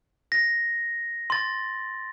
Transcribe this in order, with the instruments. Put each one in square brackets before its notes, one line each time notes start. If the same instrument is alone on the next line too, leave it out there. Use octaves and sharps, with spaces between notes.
[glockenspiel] A#6
C6 A6